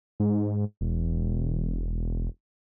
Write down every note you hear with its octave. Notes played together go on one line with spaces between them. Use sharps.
G#2
E1